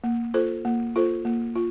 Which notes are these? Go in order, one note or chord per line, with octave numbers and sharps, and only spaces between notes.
A#3
F4 A4 C5
A#3
F4 A4 C5
A#3
F4